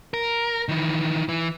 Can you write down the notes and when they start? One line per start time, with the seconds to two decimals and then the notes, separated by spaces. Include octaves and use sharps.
0.14 A#4
0.68 D#3 E3
1.29 E3